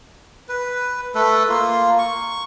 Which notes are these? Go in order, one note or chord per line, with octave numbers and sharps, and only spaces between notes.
B4
A3 A4 B4
A#3 F4
C#6